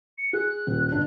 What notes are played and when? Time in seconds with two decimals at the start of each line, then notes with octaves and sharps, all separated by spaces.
0.18 C#7
0.33 G#4 F#6
0.67 D#1
0.92 G1 D4